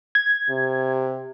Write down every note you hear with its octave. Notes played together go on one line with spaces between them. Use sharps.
G#6
C3